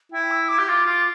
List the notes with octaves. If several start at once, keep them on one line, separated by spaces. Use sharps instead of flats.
E4 G5
E6
D6
G4
F4 D6
F4